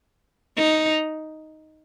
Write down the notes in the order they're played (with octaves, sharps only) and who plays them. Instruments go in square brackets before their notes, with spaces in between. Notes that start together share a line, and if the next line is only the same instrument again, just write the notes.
[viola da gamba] D#4